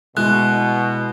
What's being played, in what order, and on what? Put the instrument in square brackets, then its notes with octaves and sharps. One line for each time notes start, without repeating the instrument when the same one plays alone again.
[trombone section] B2 [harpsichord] G#3 [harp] E4 F#4 [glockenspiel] F#6